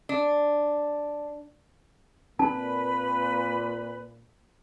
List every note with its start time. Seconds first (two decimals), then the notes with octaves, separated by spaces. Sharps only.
0.09 D4
2.39 A#2 C4 B4 A5 B5